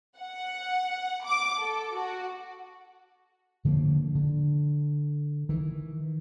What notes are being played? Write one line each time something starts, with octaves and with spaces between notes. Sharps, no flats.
F#5
D6
A4
F#4
D3 F3 G#3 A#3
D3
D#3 E3